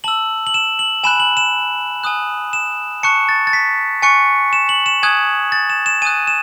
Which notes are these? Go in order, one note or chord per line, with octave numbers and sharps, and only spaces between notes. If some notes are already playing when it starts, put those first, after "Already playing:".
A5 E6 F#7
F#7
E7
F#7
G#5 B5 F#6 E7
F#7
E7
G#5 D#6 F#6
E7
A5 C#6 F#6 C#7
A6
A6
B6
G#5 C#6 F#6 C#7
E7
F#7
E7
G#5 D#6 F#6 G#6
A6
E7
E7
G#5 D#6 F#6 D#7
E7